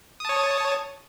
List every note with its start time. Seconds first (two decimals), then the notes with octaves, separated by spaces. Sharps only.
0.20 D#6
0.25 A5
0.29 C#5